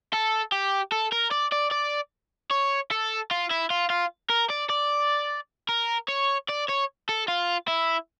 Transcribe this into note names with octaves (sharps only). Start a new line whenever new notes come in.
A4
G4
A4
A#4
D5
D5
D5
C#5
A4
F4
E4
F4
F4
A#4
D5
D5
A#4
C#5
D5
C#5
A4
F4
E4